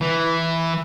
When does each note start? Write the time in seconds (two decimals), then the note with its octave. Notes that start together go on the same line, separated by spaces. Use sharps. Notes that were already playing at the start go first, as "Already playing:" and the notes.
0.01 E3